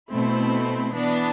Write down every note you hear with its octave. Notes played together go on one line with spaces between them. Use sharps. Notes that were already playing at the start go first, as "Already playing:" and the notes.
B2 A3 C4 E4
E3 B3 D4